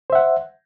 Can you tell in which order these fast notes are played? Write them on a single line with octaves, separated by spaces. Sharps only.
C5 E5 F#5